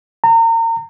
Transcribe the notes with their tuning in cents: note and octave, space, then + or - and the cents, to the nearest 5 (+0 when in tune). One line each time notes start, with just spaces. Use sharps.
A#5 -35